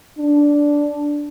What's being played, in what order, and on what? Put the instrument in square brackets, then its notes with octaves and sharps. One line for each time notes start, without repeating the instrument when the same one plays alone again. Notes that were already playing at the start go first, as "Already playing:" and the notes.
[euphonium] D4